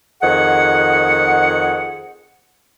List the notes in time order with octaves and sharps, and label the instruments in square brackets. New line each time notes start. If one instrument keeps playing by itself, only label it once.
[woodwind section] F2 D#3 G#4 F#5